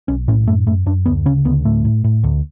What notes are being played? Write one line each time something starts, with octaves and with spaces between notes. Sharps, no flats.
B1 C#4
A2 C#4
F#2 A3
F#2 A3
F#2 D4
D2 B3
C#3 C#4
D2 B3
A2 A3
A2
A2
D2